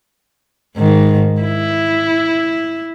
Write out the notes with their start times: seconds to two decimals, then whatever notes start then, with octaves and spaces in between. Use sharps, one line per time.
0.77 G#2 D#3
1.42 E4